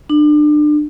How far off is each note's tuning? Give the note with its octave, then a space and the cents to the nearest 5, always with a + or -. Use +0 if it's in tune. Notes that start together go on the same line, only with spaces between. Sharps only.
D4 +30